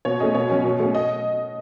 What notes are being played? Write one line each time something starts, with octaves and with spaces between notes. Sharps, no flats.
B2 C#5
A3 C#4 D#5
B2 C#5
F#3 C#4
B2
A3 C#4
D#5